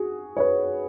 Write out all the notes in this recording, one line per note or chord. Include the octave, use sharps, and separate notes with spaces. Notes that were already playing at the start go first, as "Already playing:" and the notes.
Already playing: F#4 G#4
C#5
B4